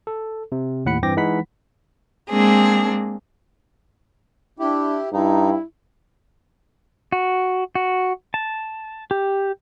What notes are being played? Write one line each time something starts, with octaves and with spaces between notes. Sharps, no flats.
A4
C3
D#2 A2 F#5 B5 C#7
G2 E3 C4 G5 D6 A#6
E3 G#3 D#4 F#5 B5 B6
G#3 A#3 C4 D4 G#4
D4 E4 G4
G2 D#4 E4
F#4
F#4
A5
G4